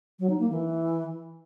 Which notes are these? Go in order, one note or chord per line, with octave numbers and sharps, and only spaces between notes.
F#3
D#4
A#3
E3